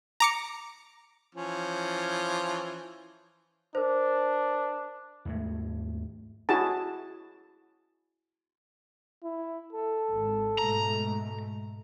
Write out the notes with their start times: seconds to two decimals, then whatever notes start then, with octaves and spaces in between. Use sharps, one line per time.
0.20 A#5 D6 C#7
1.35 E3 F3 C#4
3.75 D4 A#4 C5
5.25 D#2 G#2 G#3 A3
6.49 E4 F#4 G#4 A5
9.23 E4
9.73 A4
10.12 G#1
10.58 G#2 B2 A3 A#5